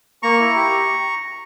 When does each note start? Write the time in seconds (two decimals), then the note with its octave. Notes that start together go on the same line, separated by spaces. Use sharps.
0.23 A#3 A#5 C#6
0.40 E4
0.56 G4